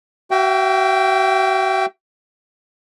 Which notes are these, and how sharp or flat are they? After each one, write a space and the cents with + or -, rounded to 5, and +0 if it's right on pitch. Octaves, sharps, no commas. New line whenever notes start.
F#4 +40 E5 +30 G5 +0